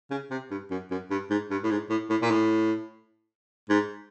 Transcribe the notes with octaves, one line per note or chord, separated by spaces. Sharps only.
C#3
C3
G2
F#2
F#2
G2
G#2
G2
A2
G#2
A2
A2
A#2
A2
G#2